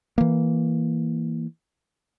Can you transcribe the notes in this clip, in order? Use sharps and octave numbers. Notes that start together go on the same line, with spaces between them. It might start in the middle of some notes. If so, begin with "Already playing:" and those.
E3 A#3